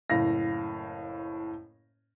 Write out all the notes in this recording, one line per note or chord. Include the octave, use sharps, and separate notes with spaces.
F#1 A2 F5 A#6